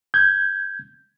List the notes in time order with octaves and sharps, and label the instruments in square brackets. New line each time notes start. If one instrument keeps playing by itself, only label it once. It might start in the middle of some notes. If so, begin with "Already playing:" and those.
[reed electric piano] G6 G#6